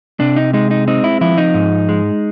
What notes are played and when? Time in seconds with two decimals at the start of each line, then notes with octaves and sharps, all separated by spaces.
0.20 C3 D4
0.36 D#4
0.53 G#3 D#4
0.71 D#4
0.88 C4 D#4
1.04 E4
1.21 F3 E4
1.38 D#4
1.54 G#2
1.89 G#3